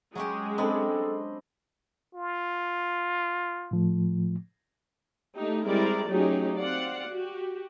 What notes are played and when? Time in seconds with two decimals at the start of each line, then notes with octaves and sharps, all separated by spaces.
0.15 F#3 G#3 C#4 G4
0.58 C4 D4 A4 D#5 B5
2.14 F4
3.71 A2 F3 A3
5.36 A3 D4 D#4 G4
5.66 G3 G#3 C4 E4 A#4 D5
6.08 F#3 A3 C#4 D#4 G4 G#4
6.58 C4 D5 F5 F#5
7.08 F#4 G4